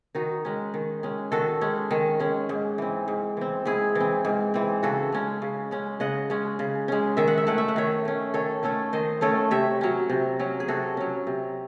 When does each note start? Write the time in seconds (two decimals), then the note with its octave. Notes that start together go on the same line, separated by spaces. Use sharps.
0.15 D#3 D#4 F#4
0.45 G#3 C#4
0.74 D#3
1.03 G#3 C#4
1.32 D#3 F#4 A4
1.61 G#3 C#4
1.91 D#3
2.20 G#3 C#4
2.49 G#2
2.78 E3 C4
3.08 G#2
3.37 E3 C4
3.65 G#2 E4 G#4
3.95 E3
4.00 C4
4.25 G#2
4.54 E3 C4
4.83 C#3 F#4 A4
5.12 G#3 C#4
5.42 C#3
5.71 G#3 C#4
6.00 C#3 D#5 F#5
6.30 G#3 C#4
6.59 C#3
6.88 G#3 C#4
7.17 D#3 E5
7.28 F#5
7.38 E5
7.47 A3 C#4 F#5
7.58 E5
7.68 F#5
7.76 D#3 C#5 E5
8.05 A3 C#4
8.34 D#3 A4 C#5
8.63 A3 C#4 A4 C#5
8.93 D#3 C5 D#5
9.21 A3 C#4 A4 C#5
9.51 C3 C#5 E5
9.81 F#3 C#4
10.10 C3
10.39 F#3 C#4
10.60 G#4
10.68 C3 F#4 A4
10.97 F#3 C#4
11.27 C3